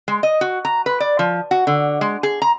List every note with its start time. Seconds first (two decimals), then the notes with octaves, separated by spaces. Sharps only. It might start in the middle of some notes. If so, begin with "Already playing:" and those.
0.08 G#3
0.23 D#5
0.41 F#4
0.65 A#5
0.86 B4
1.00 D5
1.19 F3
1.51 F#4
1.67 D3
2.01 G#3
2.23 G#4
2.42 A#5